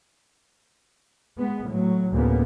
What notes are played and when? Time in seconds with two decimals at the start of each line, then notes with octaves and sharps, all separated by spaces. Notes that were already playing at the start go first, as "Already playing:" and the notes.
1.38 G#3 B3
1.67 A2 F#3
2.12 D2 A2 C#3 A#3 B3